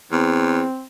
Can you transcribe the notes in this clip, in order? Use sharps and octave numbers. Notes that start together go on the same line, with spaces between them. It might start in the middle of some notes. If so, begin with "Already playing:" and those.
E2 C4